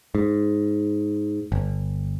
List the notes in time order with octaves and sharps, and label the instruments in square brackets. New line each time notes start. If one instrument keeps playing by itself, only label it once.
[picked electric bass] G#2
G1